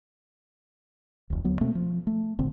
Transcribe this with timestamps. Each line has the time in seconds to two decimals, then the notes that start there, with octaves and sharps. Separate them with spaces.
1.30 F1 D2
1.44 D2 F#3 B3
1.61 B2 A3 A#3 C4
1.75 F3
2.07 A3
2.39 G#1 A#2 D3 C4